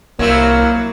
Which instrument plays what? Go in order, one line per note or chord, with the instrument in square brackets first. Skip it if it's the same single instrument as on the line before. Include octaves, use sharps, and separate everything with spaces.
[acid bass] C2 [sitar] F#3 C4 E4 [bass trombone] A#3